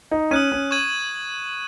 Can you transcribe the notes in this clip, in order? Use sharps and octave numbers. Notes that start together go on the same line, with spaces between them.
D#4
C#4 D#6 F#6 D#7
C#4
C#6 G#6 D#7 F#7